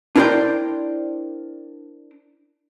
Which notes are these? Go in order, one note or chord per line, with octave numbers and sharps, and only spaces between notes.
D4 E4 A#4 C5 D5 G5